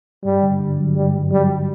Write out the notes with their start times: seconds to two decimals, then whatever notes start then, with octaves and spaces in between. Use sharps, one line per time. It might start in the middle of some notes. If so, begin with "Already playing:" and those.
0.24 G2 G3
0.43 D3
0.60 D3
0.78 F#3
0.96 G2 G3
1.13 G2
1.31 F#3 G3
1.49 G2